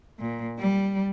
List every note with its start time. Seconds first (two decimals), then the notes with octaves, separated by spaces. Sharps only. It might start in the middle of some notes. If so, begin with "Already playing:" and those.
0.19 A#2
0.59 G3